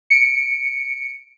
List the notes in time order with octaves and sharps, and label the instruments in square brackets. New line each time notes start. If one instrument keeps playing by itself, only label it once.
[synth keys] C#7 D7